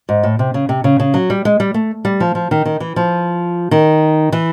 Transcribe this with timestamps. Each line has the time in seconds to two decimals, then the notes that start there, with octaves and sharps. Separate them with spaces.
0.09 G#2
0.23 A2
0.39 C3
0.54 C#3
0.69 C3
0.84 C#3
1.00 C#3
1.14 F#3
1.30 G3
1.45 G#3
1.60 G3
1.74 A3
2.05 G3
2.20 F3
2.35 F3
2.51 D#3
2.65 D#3
2.80 E3
2.96 F3
3.71 D#3
4.32 E3